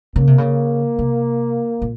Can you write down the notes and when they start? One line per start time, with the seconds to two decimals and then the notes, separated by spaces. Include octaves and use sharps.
0.16 C#3 A#3
0.27 C3
0.38 C#3
0.99 C3
1.82 A#2